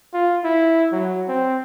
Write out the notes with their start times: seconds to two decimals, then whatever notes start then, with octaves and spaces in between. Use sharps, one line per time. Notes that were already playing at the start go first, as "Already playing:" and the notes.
0.14 F4
0.44 E4
0.92 F#3
1.28 C4